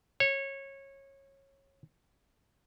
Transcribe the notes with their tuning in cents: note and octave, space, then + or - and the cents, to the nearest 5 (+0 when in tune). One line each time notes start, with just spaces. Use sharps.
C#5 -20